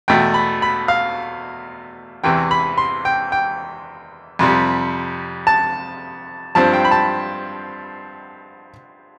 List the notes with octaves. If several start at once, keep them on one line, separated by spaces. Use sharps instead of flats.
E2 B2 A3 G5
B5
B5
F5
E2 C3 E3 G5
B5
C6
G5
G5
F2 C3 G3
A5
G2 F3 C4 A5
G5
B5
A5